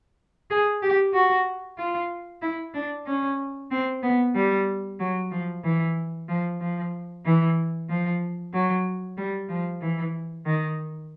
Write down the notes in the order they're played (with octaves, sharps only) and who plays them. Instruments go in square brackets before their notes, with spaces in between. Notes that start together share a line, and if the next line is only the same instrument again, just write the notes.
[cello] G#4
G4
F#4
F4
E4
D4
C#4
C4
B3
G3
F#3
F3
E3
F3
F3
E3
F3
F#3
G3
F3
E3
D#3